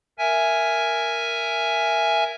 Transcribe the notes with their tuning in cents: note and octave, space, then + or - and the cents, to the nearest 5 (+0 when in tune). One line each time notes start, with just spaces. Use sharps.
A#4 +0 E5 +10 G#5 +0